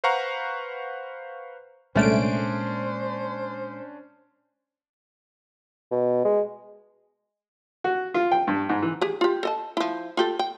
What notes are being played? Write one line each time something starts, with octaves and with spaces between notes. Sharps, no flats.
B4 C5 F5 F#5 A#5 C#6
C2 A#2 G#3 A3 C#4 D4 C5 D7
B2
G#3
F#4
F4
G5
G2
G#2
E3
G4 G#4
F4 G4
A4 D#5 A5
F3 E4
F4 G4 A4
G5